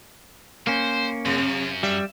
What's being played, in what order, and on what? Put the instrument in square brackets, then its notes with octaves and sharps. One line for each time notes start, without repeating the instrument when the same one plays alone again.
[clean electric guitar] A#3 C#4 [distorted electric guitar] C5
[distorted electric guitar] F#2 [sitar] C3
[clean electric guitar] G3 [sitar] E5